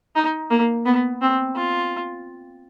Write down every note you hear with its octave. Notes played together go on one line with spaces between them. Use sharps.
D#4
A#3
B3
C4
F4